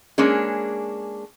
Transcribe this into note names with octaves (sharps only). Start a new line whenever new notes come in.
G#3 A#3 C#4 D4 G#4